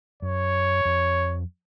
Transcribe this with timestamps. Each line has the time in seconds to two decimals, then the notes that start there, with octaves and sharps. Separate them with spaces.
0.22 F#2 C#5
0.85 F2